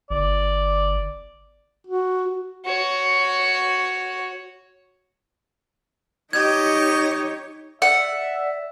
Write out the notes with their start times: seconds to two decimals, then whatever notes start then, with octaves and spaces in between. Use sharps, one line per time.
0.10 G1 D5
1.87 F#4
2.66 F#4 C#5
6.33 D#4 G4 C#5 D#5 G#6
7.82 D5 E5 F#5